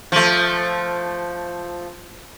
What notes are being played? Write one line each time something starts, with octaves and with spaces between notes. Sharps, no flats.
F3 A3